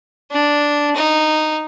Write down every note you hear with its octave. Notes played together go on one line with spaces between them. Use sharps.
D4
D#4